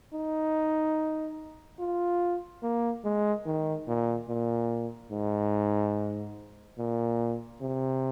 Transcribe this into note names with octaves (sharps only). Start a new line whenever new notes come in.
D#4
F4
A#3
G#3
D#3
A#2
A#2
G#2
A#2
C3